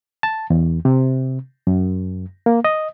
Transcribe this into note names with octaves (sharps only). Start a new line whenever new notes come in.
A5
E2
C3
F#2
A#3
D#5